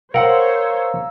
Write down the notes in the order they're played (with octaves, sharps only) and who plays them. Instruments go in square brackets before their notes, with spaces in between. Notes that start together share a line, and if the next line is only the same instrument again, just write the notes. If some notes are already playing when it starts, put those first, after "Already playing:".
[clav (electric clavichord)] A#4 F#5 [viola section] C5 C#5 [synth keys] F5 A#5 E6